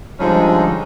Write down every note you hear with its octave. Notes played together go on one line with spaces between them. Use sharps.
D3 F3 G3 G#3 C#4 D#4